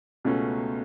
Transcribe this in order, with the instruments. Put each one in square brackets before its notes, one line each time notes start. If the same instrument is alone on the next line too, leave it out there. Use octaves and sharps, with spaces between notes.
[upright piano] C#2 B2 A3 C#4